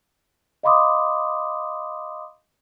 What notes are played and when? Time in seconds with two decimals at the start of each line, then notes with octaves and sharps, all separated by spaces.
0.63 D#5 F5 B5 C6 D6 D#6